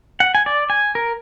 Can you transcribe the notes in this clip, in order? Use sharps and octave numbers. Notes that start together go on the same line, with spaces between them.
F#5
G#5
D5
G#5
A#4